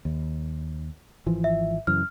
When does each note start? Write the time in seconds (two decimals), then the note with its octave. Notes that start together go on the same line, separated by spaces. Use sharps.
0.05 D#2
1.26 G#1 E3 F3
1.44 E5
1.87 F#2 C#3 E3 F6